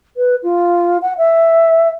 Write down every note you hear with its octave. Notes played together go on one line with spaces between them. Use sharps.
B4
F4
F#5
E5